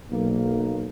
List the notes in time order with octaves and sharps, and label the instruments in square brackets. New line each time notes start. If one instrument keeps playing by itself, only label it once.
[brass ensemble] B1 A#3